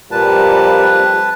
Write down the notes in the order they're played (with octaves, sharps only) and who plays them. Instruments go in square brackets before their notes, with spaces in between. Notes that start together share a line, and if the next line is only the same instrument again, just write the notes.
[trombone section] F2 G3 [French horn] A#2 [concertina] B4 A5